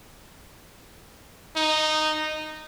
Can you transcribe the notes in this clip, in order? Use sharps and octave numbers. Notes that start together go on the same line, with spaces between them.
D#4